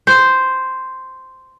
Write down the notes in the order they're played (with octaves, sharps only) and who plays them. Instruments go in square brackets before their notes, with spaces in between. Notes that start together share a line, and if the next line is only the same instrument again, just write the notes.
[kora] C5